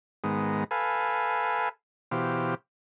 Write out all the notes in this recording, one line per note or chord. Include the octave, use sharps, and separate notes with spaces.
G#2 D#3 G#3 B3
A4 B4 F5 G#5
B2 E3 G4 C5 F5